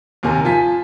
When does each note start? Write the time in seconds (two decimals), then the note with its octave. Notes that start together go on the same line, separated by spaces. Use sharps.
0.23 D#2 C3 A#4 G#5
0.44 F3 F4 G#5 A5 B6